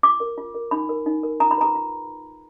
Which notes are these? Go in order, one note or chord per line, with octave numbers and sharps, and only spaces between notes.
F4 D6
A#4
F4
A#4
D#4 B5
A#4
D#4
A#4
F4 A#5
B5
G#4 B4 A#5
F4